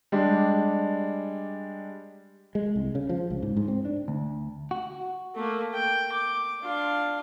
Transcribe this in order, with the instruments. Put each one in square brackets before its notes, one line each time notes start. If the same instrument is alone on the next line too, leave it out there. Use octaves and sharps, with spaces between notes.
[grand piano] G3 G#3 D4
[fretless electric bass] G#3
C2
C#3
F3
C#2
G#2
G#2
C4
D4
[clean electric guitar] D2
F#4
[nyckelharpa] A3 A#3
G5
D6
D4 F4